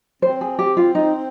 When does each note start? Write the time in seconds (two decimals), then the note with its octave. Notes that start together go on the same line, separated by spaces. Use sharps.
0.22 C4 C5
0.41 G#4
0.59 G4
0.77 F4
0.95 D#4